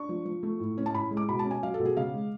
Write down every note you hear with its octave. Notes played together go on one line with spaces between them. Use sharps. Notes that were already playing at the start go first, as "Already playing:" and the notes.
Already playing: D4 C#6
F3
F3
A3
A2
C#4
A5
A2 B5
G#3
D6
B2 B5
A5
C#4
G#5
F#3 F5
A4
B2
G#4
C#3 F5
G#3